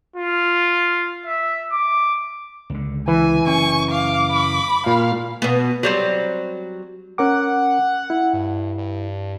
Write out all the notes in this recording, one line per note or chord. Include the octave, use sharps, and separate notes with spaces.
F4
E5
D6
C#2 D3
E3 G#5
F#1 C#4 C#6
F5 D6
B5
A#2 F5
B2 B3
F#3 G3 C4
C#4 A#4 F#5 D6
E4
G2
G2